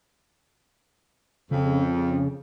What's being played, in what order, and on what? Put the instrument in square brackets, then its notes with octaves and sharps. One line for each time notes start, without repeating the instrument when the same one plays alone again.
[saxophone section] F2 [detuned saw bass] C#3